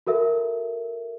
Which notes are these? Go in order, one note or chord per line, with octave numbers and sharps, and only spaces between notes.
F#4 A4 A#4 E5